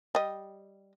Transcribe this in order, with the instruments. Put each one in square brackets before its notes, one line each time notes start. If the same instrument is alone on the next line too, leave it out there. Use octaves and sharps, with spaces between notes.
[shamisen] G3 D#5